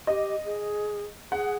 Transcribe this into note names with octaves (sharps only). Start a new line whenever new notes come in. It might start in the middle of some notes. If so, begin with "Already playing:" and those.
G4 D#5
G#4
G#4 F#5